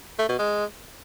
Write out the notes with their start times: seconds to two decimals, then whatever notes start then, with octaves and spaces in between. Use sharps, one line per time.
0.19 A3
0.29 B2
0.39 G#3